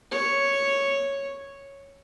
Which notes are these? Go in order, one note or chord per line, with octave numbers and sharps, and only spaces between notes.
C#5